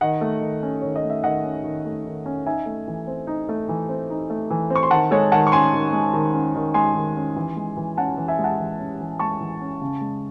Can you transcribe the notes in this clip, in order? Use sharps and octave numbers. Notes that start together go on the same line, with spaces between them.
D#3 D#5 F#5
A3
D#3
C#4
D#3 C#5
D#5
A3
E5
D#3 D#5 F#5
C#4
D#3
A3
D#3
C#4
D#4 E5 G#5
A3
E3
C4
D#4
A3
E3
C4
D#4
A3
E3
C4
C#6
C6
D#3 F#5 A5
G#3 A4 C#5
D#3 F#5 A5
C#6
C#4 G#5 C6
D#3
G#3
D#3
C#4
D#3
G#3 G#5 C6
D#3
C#4
E3
G#3
E3
C#4 F#5 A5
E3
E5 G#5
G#3
F#5 A5
E3
C#4
E3
G#3 A5 C#6
E3
C#4
C#3
G#3